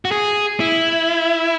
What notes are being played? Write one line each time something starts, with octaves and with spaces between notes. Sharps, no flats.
F#4
G#4
E4